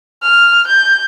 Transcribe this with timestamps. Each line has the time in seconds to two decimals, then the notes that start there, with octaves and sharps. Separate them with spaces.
0.23 F6
0.67 G6